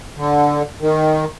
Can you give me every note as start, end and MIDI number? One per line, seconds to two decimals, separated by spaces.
0.17 0.62 50
0.80 1.25 51